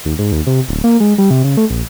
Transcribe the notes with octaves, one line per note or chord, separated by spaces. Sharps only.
D#2
G#2
D#2
C3
D1
A#3
G#3
G3
C3
C#3
A3
A#1